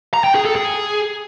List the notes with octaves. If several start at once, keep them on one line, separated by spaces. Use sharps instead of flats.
A#5
G5
G#4
A4
G#4